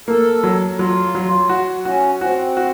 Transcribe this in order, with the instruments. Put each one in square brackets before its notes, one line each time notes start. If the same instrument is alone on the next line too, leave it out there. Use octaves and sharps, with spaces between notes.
[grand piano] A#3 [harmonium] A4
[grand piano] F#3
[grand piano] F#3 [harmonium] F4
[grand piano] F#3
F#4
[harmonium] C#4 [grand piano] F#4
[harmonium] C4 [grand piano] F#4
[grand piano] F#4